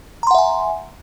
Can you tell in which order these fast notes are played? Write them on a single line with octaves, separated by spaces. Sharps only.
A#5 C6 F#5 E5 G#5